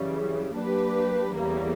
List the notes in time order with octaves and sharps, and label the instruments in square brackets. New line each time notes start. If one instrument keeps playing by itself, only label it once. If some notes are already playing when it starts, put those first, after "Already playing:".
Already playing: [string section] F#2 C#3 E3 G3
F#3 A#3 D4 G4 B4
E2 C#3 E3 G3 A#3